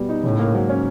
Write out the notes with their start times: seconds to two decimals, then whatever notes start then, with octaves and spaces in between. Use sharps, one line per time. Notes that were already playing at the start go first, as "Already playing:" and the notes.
Already playing: B2 G3 B3
0.09 D#4
0.23 A2 C#3
0.39 A#3
0.54 G#2 F#3
0.69 C#4